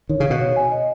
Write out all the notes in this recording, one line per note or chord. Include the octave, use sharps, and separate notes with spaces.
D#3 C#5
C#3
F5
B2
C#5
G#5
D#5